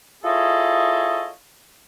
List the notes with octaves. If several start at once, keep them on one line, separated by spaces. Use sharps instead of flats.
E4 F4 G#4 A4 C#5 D#5